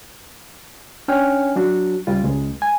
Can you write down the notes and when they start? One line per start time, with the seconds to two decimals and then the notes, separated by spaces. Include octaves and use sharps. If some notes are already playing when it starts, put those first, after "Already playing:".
1.08 C#4 D4 C#5 G5 G#5 F6
1.56 F#3 D4 F#4
2.07 C#2 G3 F4
2.24 C#2 G#3
2.62 G#5